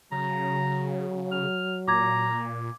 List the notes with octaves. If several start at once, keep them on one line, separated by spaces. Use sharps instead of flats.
C#3 F#3 A#5
F6
A#2 A#5 D6 G#6